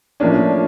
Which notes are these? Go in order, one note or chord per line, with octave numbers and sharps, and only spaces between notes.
A2 F3 A#3 C#4 D4 D5